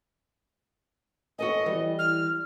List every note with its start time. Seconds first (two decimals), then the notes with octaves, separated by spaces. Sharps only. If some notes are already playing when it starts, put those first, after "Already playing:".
1.39 F#4 A4 D#5 G#5
1.66 E3 G3
1.99 F6